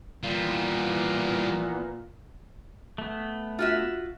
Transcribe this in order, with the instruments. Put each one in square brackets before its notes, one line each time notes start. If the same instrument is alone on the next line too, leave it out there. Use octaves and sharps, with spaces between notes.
[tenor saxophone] A#2 [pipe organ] E3 B3 [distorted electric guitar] G3 F4
[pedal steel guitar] A3 B3
[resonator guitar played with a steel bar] F4 F#4 E5